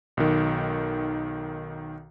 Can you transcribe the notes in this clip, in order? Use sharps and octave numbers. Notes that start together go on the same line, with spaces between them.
B1 D#3